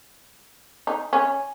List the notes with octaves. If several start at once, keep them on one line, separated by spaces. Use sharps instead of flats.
D#4
C#4